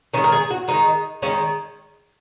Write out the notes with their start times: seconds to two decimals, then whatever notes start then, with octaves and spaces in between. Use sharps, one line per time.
0.14 D#3 C#4
0.17 G#3
0.24 A#4
0.32 G#4
0.50 F#4
0.68 D#3 G#3 D#4
1.22 D#3 G#3 C#4